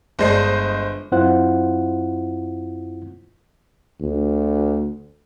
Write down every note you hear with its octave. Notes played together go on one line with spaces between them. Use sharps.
G1 G#3 D4 C5 D#5 C7
F#2 C4 E4 F4 C5 F#5
D2